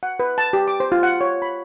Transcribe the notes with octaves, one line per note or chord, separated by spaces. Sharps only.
F#5
B4
A5
G4
D6
C5
F4
F#5
C#5
B5